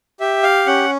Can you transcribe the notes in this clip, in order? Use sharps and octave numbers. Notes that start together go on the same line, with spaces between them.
G4 E5
F5
C#4 F#5